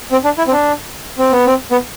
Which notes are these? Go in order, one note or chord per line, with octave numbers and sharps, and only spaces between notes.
C4
D4
E4
C4
D4
C4
B3
C4
B3